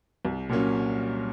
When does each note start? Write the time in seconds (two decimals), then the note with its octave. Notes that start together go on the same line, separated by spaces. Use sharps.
0.25 C2
0.49 A#2 F#3 A#3 C#4